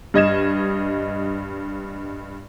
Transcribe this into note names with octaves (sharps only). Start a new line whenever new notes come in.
G2 D#5 G#6 E7